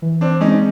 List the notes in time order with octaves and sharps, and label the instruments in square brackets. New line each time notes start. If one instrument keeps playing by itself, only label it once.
[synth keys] E3
[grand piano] C4 D4
[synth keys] G#3 C4 [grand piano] C#4 D#4